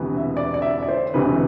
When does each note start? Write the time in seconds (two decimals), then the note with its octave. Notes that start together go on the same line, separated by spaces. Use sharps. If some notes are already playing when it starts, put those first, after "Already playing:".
Already playing: E1 D2 C3 E3 B3
0.17 E5
0.37 D5
0.54 D5
0.62 E5
0.83 D5
0.88 C5
1.14 E1 D2 C3 E3 B4